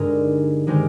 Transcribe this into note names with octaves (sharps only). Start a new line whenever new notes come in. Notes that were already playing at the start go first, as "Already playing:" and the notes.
Already playing: G2 D3 G#3 D#4 A#4
D#3 G#3 C4 G4 A#4